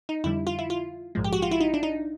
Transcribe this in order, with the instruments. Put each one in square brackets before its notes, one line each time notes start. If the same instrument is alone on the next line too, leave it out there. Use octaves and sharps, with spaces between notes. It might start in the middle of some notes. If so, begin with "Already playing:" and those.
[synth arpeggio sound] D#4
F2 D3 G3 E4
F4
E4
F4
A#1 G#2 F3 G#3
G4
F#4
F4
E4
D#4
D4
D#4